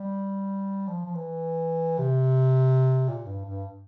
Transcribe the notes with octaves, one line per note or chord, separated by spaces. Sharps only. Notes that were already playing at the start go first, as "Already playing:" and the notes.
Already playing: G3
F3
F3
E3
C3
A#2
G2
G2